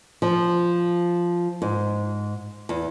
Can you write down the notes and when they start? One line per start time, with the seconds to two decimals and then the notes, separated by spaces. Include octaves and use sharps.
0.22 F3
1.62 G#2
2.69 E2